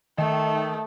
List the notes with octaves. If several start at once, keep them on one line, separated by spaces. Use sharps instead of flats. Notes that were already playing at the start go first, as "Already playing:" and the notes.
D#3 A3